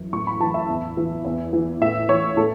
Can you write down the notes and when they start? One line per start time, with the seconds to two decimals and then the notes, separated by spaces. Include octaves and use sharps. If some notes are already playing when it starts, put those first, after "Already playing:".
Already playing: F#2 E3
0.13 A2 C#6
0.27 B5
0.40 E3 A5
0.54 E5
0.68 E2
0.97 E3
1.25 E2
1.53 E3
1.81 A2 E5
2.09 E3 C#5
2.37 A2 A4